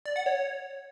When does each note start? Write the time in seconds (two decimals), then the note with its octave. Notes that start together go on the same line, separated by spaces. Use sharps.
0.05 D5
0.16 F#5
0.26 C#5